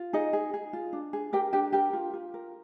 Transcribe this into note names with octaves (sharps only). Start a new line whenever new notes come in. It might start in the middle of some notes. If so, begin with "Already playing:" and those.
Already playing: F4
D#4 G#4 D#5
G#4
G#4
F4
D4
G#4
G4 A#4 G5
D4 G4 G5
G4 A#4 G5
F4
F4
A#4